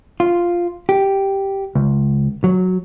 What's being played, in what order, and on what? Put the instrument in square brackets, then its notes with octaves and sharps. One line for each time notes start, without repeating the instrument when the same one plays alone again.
[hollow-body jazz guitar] F4
G4
C#2
F#3